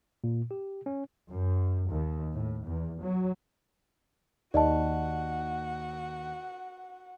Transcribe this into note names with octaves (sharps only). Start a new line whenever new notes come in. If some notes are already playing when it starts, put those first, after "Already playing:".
A#2
G4
C#4
F#2
D#2
A2
E2
F#3
D#2 F#4 D5 D#5 F#5 A5